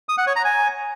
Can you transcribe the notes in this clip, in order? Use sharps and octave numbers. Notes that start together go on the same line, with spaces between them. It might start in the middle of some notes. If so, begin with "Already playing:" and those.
D#6
F#5
C#5
A#5
G#5